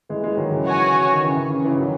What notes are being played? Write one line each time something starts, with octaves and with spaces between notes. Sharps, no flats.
E3 G#3
E3 G#3
D#3 F#3
C#3 E3
F#4 C#5 G#5
D#3
C#3 E3
C#3
C#3
C#3 E3
D#3 F#3